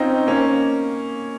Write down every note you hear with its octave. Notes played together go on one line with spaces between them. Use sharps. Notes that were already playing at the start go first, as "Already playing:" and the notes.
Already playing: C4 C#4 D#4 F4
A#3 C#4